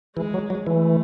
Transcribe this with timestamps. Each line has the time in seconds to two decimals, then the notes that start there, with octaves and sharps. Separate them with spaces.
0.17 E3 G#3
0.34 F#3
0.50 F#3
0.66 E3 A3